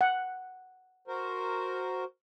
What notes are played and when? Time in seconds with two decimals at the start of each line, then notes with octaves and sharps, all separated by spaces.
0.01 F#5
1.08 F#4 A#4 C5